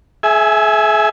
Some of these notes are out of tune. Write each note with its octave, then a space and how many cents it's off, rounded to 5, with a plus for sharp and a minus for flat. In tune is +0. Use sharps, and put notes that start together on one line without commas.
G#4 +40 E5 -5 G#5 +0